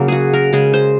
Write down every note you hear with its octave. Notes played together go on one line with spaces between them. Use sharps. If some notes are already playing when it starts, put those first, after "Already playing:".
Already playing: C#3 F#3 A#3
F#4 G#4
A#4
C#3 G#3 G#4
C5